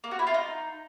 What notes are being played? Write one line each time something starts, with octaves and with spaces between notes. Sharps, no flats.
A#3
F#4
E4
F4
D#4